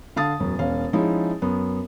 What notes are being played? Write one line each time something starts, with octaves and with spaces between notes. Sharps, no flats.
D3 F5 A5 D#6 A6
E1 F#2
E1 C#4 F5
F3 G#3 C#4 D#4 E4
F#2 B3